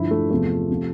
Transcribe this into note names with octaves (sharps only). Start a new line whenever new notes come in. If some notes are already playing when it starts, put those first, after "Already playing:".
Already playing: G2 D3 F3 E4
A3
E2 C3 F3 A3
C3 F3